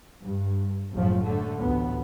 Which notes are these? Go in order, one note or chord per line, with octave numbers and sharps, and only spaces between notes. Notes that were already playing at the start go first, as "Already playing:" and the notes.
G2
F#1 A2 F3 A3
D3 A3
A1 D2 B3